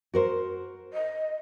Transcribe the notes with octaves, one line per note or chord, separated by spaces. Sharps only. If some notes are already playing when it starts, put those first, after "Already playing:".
F#4 A#4 C5
D#5